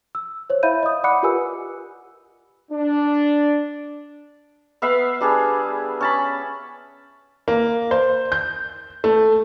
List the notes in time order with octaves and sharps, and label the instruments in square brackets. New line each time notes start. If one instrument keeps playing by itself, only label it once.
[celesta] E6
C5 C#5
E4 E5 F5 B5 G6 D#7
D#5 D#6
D5 F#5 B5 D6 F#6 C#7
F4 G4 A#4 B4 G#5 E6
[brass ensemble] D4
[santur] B3 E5 F5 B5
G3 D4 G#4
C#4 A5 B5
[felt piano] A#3
C5
G6
A3